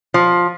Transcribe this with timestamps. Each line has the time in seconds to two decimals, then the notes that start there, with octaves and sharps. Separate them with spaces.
0.14 F3